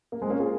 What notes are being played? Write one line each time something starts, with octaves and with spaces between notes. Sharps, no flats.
A#3
G#3 C4
A#3 C#4
F4 G#4